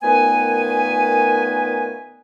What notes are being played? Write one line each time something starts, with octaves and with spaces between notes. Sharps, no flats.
A#2 D#3 A3 B3 B4 G#5